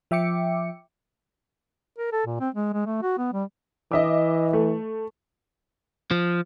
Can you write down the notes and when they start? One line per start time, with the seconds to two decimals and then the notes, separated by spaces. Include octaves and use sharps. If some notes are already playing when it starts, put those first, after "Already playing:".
0.11 F3 E5 G5 D6 C#7
1.98 A#4
2.12 A4
2.26 A#2
2.40 C4
2.55 G#3
2.73 G#3
2.86 A3
3.02 F#4
3.18 B3
3.33 G3
3.92 E3 D#5 E5 D6
4.53 A3
6.11 F3